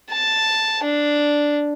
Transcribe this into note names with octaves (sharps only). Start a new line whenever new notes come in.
A5
D4